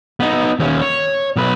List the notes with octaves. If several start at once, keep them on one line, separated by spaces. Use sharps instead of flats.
B3 D#4
D#2 C#4
C#5
B1 B4